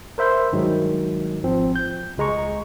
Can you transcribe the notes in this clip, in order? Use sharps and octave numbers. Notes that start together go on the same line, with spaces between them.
A#4 C5 E5 B5 G6
G2 D#3 F#3 G#3
G#1 F3 C4
G6
C#2 G#3 A#5 C#6